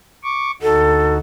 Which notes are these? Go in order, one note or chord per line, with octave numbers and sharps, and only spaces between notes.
C#6 D6
D2 D#4 F#4 A4